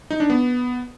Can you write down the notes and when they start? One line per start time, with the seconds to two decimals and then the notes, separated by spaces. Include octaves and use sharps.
0.10 D#4
0.20 D4
0.30 B3